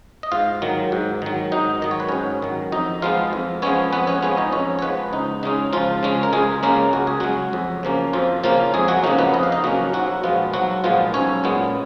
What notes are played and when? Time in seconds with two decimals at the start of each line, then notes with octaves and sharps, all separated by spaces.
0.23 D#5
0.32 G#2 F4 F5
0.62 D#3 F#3
0.92 G#2
1.22 D#3 F#3
1.52 G#2 D#4 D#5
1.82 D#3 F#3 D#5
1.91 C#5
2.00 B4
2.09 G#2 C#4 C#5
2.42 D#3 F#3
2.72 F2 D#4 D#5
3.02 F3 G#3 B3 F4 F5
3.33 F2
3.62 F3 G#3 B3 C#4 C#5
3.93 F2 B3 B4
4.07 C#4 C#5
4.22 F3 G#3 B3 C#4 C#5
4.37 D#4 D#5
4.52 F2 C#4 C#5
4.79 C#5
4.82 F3 G#3 B3 B4
5.13 C#2 D#4
5.43 C#3 G#3 C#4 D#4
5.73 C#2 F3 F4
6.03 C#3 G#3 C#4
6.23 A#4
6.33 C#2 G#3 G#4
6.63 C#3 G#3 A#3 C#4 A#4
6.93 C#2 F#4
7.07 G#4
7.20 C#3 F#3 G#3 C#4 F#4
7.53 F2
7.83 C#3 F3 A#3 C#4
8.13 F2 F3 F4
8.43 C#3 F3 A#3 C#4 F4
8.74 F2 G#3 G#4
8.88 F#3 F#4
9.04 C#3 F3 A#3 C#4 D#4
9.18 B3 B4
9.34 F2 D#5
9.43 F5
9.52 D#4 D#5
9.64 C#3 F3 F#3 A#3 C#4 F#4
9.93 B1 F#3 F#4
10.23 A#2 F3 G#3 B3 F4
10.53 B1 F#3 F#4
10.84 A#2 F3 G#3 B3 F4
11.14 B1 C#4 C#5
11.44 A#2 G#3 B3